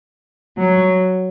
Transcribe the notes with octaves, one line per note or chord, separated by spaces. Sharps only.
F#3